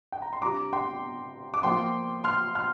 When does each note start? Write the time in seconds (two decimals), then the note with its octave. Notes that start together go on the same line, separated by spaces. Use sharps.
0.12 G5
0.22 A#5
0.33 C6
0.42 C3 G3 D4 F4 A#5 D6
0.73 G5 C6
1.54 D6
1.63 F3 A#3 F4 G5 C6
2.24 C6 F6
2.55 C6 F6